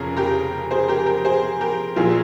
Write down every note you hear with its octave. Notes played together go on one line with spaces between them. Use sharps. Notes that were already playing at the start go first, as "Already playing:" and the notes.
Already playing: F1 F2 C#3 G#4 A#4
G4 A#4
G#4 C5
G4 A#4
G4 A#4
G#4 C5
G4 A#4
A#1 A#2 F4 G#4